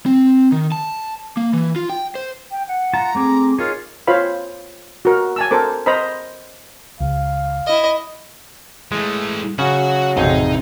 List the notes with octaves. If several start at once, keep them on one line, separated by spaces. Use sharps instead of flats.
C4
D#3
A5
A#3
E3
F4
G5
C5
G5
F#5
F4 A5 A#5
A3 C4 G#4 D6
D#4 F4 G#4 A#4 C#5
F4 C5 C#5 F5 B5
F#4 A#4
G#5 A5 E6
A4 A#4 C5 D6
C5 D#5 A#5 B5
C#2 F5
E4 D#5
E3 G#3 A3
C#3 F#3 C#4 F#4 F#5
A1 F2 C3 D#4 G#4